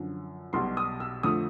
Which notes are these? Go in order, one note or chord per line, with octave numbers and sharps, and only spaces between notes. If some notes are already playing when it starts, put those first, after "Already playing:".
Already playing: F#2 D3 F3
B1 B2 G3 C6
D#6
E6
F2 D3 F3 A3 D#6